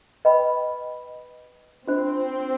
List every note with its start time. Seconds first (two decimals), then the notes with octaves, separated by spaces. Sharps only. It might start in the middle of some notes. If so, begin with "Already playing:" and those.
0.25 B4 D#5 G5 B5
1.88 C4 D4 F4 C5